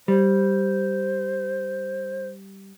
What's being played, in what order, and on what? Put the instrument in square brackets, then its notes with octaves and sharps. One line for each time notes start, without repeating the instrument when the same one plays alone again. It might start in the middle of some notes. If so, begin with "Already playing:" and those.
[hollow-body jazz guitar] G3 [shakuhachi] C5